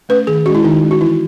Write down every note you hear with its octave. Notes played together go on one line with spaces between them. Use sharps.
A3 C#4 B4
D#3 G#4
G#3 C#4 E4 F#4
D#3 D#4
G#3 C#4
F#4
E3 E4